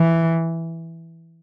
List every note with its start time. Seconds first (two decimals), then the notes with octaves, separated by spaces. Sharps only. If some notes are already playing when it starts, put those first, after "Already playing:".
Already playing: E3